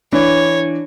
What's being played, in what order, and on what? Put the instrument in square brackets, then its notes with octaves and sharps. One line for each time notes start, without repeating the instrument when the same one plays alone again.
[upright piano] E3 [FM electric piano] D4 [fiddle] C#5